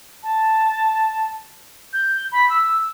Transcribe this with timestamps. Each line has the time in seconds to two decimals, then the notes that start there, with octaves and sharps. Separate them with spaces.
0.23 A5
1.93 G6
2.32 B5
2.50 E6